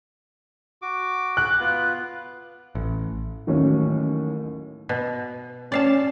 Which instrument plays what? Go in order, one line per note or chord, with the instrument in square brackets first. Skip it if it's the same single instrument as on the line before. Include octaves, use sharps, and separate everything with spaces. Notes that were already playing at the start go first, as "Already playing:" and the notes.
[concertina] F#4 D6
[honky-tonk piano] F#6
[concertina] B3 F4
[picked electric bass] A1
[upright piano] A1 D#2 F#3 A3 C#4
[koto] B2
[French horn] C#4 [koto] D5 F5 A5